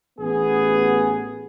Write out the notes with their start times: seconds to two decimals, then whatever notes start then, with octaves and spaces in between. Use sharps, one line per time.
0.20 A1 B3 G#4